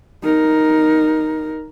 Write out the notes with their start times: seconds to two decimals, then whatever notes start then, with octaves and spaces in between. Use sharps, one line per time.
0.23 D#4 A#4